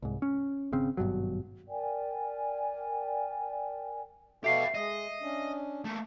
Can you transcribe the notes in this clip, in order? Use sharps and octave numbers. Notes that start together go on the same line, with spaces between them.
C2 G#2
C#4
G#1 C#3 C4
G#1 G2 B2 F#3
A#4 D5 G5 G#5
B2 F#4 G4 A4 E5 F5 C7
G#3 D#5
C#4 D4
A3 A#3